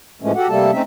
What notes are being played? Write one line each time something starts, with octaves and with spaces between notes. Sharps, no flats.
A2 E3 F3 G#3 A3 C#4
F#4 G4 A4 F#5
C3 G3 A3 A#3 A4 A5
A3 C4 C#4 D#4 E5